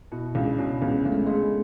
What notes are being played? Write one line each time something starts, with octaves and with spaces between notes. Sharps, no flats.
B2 E4
C#2 D4
B2 C#4
C#2 B3
C#2 A3
G#3
G#3 A3